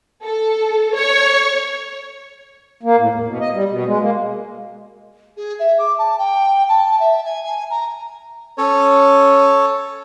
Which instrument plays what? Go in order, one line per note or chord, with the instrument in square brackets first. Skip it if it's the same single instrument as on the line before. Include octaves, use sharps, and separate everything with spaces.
[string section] A4
C#5
[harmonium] A#3
A2
E2
B2
D#5
G3
B2
G#3
A#3
[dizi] G#4
E5
D6
A5
G5
A5
E5
G#5
G#5
A#5
[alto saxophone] C#4 [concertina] A4 C#5